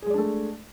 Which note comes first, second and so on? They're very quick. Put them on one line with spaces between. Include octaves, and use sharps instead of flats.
G#4 G#3 D5 D4 A3